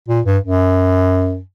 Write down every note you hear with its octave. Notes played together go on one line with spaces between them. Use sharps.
A#2
G2
F#2